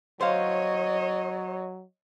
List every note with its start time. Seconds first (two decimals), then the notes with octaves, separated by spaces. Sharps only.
0.21 F#3 C5 C#5 D#5 F5